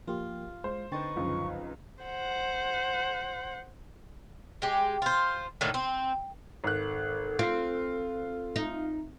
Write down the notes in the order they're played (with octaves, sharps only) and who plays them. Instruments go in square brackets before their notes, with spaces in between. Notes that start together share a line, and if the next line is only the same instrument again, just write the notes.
[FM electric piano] F3 A#3 G4 [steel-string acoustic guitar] F4
[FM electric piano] G#3 [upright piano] C5
[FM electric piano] D3 G5 A6 [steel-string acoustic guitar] C4 D#4 B4 [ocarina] C#6
[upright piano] C#2 F3 [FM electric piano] F#2 D3
[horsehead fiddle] C5 F#5
[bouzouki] G#3 G4
F4 C5
A2 D3 D#3 A#3
C4
[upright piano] G#1 F#6 [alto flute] A4
[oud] C4 [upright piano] F4 C7
[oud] D#4